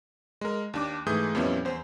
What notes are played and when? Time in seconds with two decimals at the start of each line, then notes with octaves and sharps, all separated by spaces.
0.41 G#3 A#4
0.74 D#2 D4 D6
1.06 G#2 E3 A3 G#4 D#6 G6
1.35 F2 A#2 G3 B3 C#4 E4
1.65 E2 C5